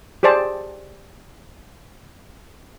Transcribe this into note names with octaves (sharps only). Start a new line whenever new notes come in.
G4 G#4 C5 D5 A5